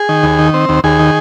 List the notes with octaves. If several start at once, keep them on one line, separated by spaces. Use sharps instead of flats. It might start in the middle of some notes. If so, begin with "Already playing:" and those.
Already playing: G#4
D#3
D#2
D#3
C4
D#2
D#2 G#4
D#3